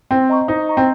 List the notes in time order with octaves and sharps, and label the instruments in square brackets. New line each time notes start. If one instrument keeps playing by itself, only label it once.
[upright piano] C4 [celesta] C5
[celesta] D#5 A#5 C#6
[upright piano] D#4 [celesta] C5
[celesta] D#5 A#5 C#6
[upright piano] C4